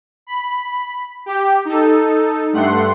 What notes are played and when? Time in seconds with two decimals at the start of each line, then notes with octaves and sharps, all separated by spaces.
0.27 B5
1.26 G4
1.65 D#4 A4
2.52 G2 A3 F#5 C6